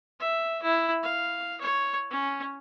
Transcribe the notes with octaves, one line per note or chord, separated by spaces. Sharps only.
E5
E4
F5
C#5
C#4